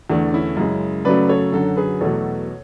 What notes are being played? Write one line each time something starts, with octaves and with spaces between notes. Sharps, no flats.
E2 D3 A3 D4
C#4 E4
F#2 C#3 G#3
F#2 C#3 F#3 A3 B4 D5
A4 C#5
F#2 D3 F#3 F#4 A4
G#4 B4
E2 B2 F#3 A3 A4 C#5